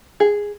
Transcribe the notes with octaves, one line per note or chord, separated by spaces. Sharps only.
G#4